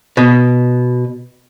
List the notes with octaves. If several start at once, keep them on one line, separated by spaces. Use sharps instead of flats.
B2